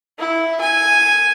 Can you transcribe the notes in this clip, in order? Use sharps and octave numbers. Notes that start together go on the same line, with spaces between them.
E4
G#5